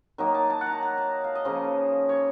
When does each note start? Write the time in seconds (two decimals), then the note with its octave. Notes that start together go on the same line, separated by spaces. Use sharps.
0.18 D#3 F#3 A#3 D#4
0.34 A5
0.50 A5
0.61 F#5
0.66 A#5
0.72 A5
0.83 A#5
0.98 A5
1.24 F5
1.35 D#5
1.45 C#3 F3 A#3 C#4
2.09 C#5